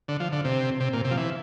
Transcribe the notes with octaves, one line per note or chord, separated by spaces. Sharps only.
D3
F3
D3
C3
C3
A#2
C3
F3
E3